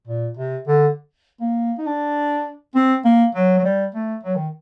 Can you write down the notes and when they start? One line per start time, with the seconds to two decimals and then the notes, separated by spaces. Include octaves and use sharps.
0.07 A#2
0.37 C3
0.67 D3
1.41 A#3
1.78 D#4
1.86 D4
2.75 C4
3.05 A#3
3.34 F#3
3.58 F#3
3.64 G3
3.95 A3
4.23 F#3
4.36 D#3